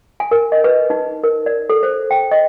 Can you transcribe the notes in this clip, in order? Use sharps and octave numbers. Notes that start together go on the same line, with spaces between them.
G#5
A#4
D#5
B4
D#4
A#4
D5
A4
C5
G5
D#5